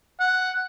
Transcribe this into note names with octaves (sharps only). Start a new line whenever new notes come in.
F#5